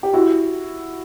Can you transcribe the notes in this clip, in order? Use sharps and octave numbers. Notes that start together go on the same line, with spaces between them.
G4
E4 F#4